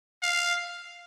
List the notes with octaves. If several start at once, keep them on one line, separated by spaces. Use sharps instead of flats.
F5